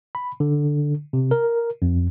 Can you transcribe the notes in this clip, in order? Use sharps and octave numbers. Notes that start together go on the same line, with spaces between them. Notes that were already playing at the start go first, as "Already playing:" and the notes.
B5
D3
C3
A#4
F2